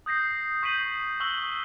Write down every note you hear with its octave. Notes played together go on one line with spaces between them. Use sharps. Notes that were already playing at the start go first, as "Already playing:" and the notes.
D#6 G6 A#6 C7
C#6 G6 B6 C7 D#7 F#7
C#6 E6 F#6 F#7 G7